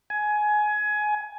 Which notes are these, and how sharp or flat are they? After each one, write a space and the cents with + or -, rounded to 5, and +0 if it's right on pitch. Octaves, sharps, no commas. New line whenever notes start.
G#5 +20